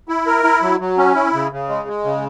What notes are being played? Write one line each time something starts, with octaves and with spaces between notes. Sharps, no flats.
E4
A#4
E4
F#3
F#3
C#4
E4
C#3
C#3
G#3
G#3
C#3